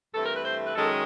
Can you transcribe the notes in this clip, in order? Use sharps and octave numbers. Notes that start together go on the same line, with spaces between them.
G2 E3 A3 C4 A4
A#4
B4
C5
B4
F#2 D#3 G#3 C#4 A4